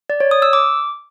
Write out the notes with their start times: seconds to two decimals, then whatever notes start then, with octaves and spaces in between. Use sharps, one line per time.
0.10 D5
0.20 C#5
0.31 D#6
0.42 E6
0.53 D6